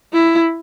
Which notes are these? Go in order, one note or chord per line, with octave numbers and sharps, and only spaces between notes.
E4